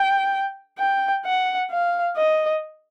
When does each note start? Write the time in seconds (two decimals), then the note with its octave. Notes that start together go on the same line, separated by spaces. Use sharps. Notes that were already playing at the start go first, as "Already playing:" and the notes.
Already playing: G5
0.78 G5
1.26 F#5
1.70 F5
2.17 D#5